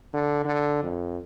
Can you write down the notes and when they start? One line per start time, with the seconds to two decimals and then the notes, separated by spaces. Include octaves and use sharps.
0.13 D3
0.45 D3
0.83 F2